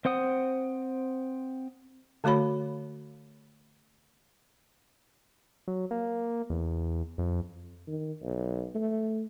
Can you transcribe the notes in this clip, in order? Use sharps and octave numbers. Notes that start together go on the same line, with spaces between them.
C4 C5 F#5 D#6
D3 A3 F#4 C#5 B5
F#3
A#3
E2
F2
D#3
B1
A3